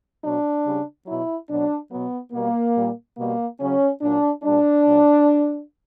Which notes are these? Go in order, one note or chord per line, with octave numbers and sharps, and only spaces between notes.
B2 F#3 D4
C#3 G3
B2 F#3 E4
B2 F#3 D4
B2 F#3 B3
B2 G3 A#3
A#2 G3
B2 G3 A#3
C#3 F#3 C#4
A#2 F#3 D4
A#2 G3 D4
A#2 F#3